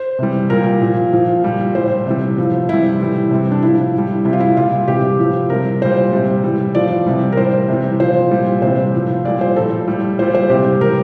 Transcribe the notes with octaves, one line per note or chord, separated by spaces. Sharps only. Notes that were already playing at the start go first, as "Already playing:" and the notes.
Already playing: C5
C3 E3 G3
A#2 G3 A#4
A#2 F3
A#2 F3
A#2 G3
A2 G3 C5
C3 E3 G3
A2 F3
C3 E3 G3 E4
A2 E3 G3
C3 G3
D4
A2 F3 E4
A2 G3
C3 G3 E4
F4
E4
A#2 G3 F4
C3 E3 G3 G4
A2 F3
C3 G3 A#4
A#2 G3 C5
C3 G3
A2 E3 G3
A2 F3 D5
C3 E3 G3
A#4
A2 E3 G3 C5
C3 E3 G3
A#2 F3 C5
A#2 G3
C3 E3 G3 C5
A2 F3
A#2 G3 D5
C5
A2 F3 A4
A2 G3
A#2 G3 C5
C5
C3 E3 G3 G4
A2 E3 G3 A#4